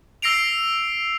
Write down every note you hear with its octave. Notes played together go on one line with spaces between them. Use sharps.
E6 A#6 C7 D7 F7